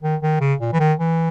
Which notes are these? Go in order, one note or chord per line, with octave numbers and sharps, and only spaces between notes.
D#3
D#3
C#3
A#2
E3
D#3
E3